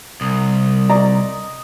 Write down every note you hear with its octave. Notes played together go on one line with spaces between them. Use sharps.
C2 D#6
D5 D#5 A#5